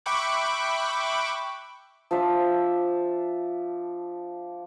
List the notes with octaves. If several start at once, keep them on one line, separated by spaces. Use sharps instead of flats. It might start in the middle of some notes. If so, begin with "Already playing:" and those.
E5 G5 B5 C#6 D6 F#6
F3 D4 E5